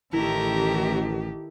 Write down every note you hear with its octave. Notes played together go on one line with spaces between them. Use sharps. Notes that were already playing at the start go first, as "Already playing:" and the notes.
A1 D#3 A3 E4 G4 A#4